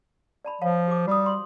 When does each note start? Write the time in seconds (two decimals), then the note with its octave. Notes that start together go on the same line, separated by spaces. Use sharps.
0.45 D5 A5 B5
0.61 F3 C#5 F5 A5
0.88 G4 D6
1.07 G3 F#4 D#6
1.26 C6